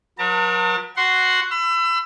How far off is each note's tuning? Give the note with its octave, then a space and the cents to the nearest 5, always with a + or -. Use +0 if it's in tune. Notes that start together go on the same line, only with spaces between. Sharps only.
F#3 -35 A#4 +40 A5 +45
F#4 +0 F#5 +0 C6 +0
B5 +35 E6 +30